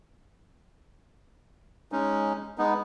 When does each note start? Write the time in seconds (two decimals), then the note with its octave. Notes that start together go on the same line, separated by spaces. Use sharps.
1.92 G#3 C#4 D#4
2.58 G#3 B3 D#4